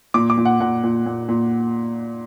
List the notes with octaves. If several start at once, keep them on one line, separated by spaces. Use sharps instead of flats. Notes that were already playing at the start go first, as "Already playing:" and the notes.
A#2 D6
D6
A#2
F#5
A#2 F#5
A#2
A#2
A#2